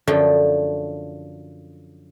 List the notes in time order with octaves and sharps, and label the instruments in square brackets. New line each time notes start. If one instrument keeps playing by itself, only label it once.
[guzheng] F#2 D3 F3 A3 G5